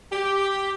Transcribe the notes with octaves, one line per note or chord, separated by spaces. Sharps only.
G4